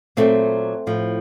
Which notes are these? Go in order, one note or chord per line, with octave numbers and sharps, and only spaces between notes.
A#2 F#3 A3 C4
A2 F3